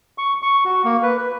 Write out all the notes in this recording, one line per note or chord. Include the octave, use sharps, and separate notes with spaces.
C#6
C#6
F#4
A#3
B4
B4